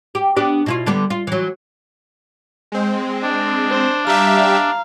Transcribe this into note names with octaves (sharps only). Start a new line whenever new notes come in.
G4
B3 D4 G4
B2 E4 F4
D3 G3 B3
F4
E3 F#3
G#3 C4
D4
C5
G3 G4 E5 F5 A#5